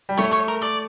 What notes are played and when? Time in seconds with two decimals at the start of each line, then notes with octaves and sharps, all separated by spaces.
0.09 G3
0.18 A3 C#5
0.33 C#5
0.48 A#4
0.63 D5